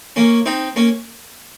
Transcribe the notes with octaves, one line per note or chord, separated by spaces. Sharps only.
A#3 C#4
C4 D#4
A#3 C#4